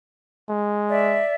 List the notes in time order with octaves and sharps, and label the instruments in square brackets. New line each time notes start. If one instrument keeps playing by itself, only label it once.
[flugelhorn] G#3
[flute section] D5 E5